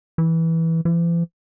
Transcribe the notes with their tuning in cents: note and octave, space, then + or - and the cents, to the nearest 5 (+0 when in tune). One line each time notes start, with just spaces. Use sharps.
E3 -10
E3 +45